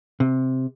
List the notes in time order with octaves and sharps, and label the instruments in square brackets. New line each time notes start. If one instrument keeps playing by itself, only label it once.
[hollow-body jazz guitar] C3